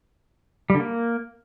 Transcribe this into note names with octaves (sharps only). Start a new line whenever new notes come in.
G3
D3
A#3